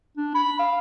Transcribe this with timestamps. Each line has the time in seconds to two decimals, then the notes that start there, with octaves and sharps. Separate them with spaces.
0.17 D4
0.35 B5
0.59 F5